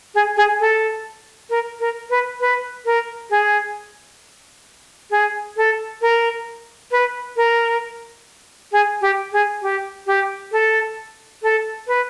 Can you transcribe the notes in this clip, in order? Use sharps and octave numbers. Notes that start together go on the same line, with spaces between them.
G#4
G#4
A4
A#4
A#4
B4
B4
A#4
G#4
G#4
A4
A#4
B4
A#4
G#4
G4
G#4
G4
G4
A4
A4
B4